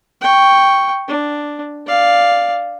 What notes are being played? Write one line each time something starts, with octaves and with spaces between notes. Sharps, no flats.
G5 C#6
D4
D5 F5